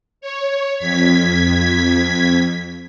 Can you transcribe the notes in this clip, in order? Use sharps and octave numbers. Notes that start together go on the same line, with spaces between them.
C#5
F2 G#6 B6